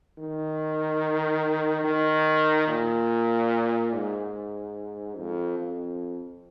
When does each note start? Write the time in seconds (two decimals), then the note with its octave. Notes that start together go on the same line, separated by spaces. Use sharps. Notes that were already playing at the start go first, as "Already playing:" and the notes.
0.19 D#3
1.85 D#3
2.68 A#2
3.93 G#2
5.17 F2
5.59 F2